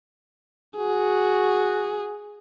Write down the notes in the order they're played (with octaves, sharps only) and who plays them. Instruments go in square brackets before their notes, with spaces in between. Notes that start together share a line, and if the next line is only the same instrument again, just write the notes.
[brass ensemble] F#4 [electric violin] G#4